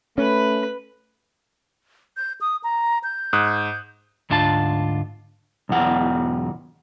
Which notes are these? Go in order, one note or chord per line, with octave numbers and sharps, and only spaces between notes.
A3 C#4 B4 B5
G6
D#6
A#5
G6
G#2 D#6 F#6
D2 G#2 D4 F4 A5
B1 E2 F#5